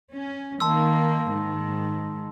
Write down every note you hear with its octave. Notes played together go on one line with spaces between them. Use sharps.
C#4
D#3 A#3 A5 C6 E6
G#2 D#3